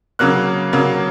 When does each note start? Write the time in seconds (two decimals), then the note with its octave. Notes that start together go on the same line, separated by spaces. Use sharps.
0.19 C#3 F#3 A#3 F#6
0.73 C#3 F#3 A#3